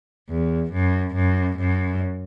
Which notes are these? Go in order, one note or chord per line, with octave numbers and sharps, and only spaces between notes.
E2
F#2
F#2
F#2